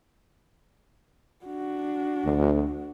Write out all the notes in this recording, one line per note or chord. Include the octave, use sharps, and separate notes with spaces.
D4 F#4
D2